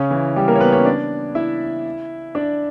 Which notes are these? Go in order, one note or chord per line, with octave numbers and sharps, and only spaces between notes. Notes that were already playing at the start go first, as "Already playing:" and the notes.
Already playing: C#3 C#4
E3 E4
G3 G4
A#3 A#4
C#5
B3 B4
C#4 C#5
D4 D5
E4 E5
D4 D5